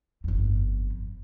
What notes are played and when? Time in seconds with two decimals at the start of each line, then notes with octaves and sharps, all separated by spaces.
0.24 G1 F2